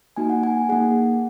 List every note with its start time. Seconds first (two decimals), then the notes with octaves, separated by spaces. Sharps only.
0.16 A#3 D#4 F#4 G#5
0.30 F#5
0.43 G#5
0.69 A#3 D#4 G#4 F#5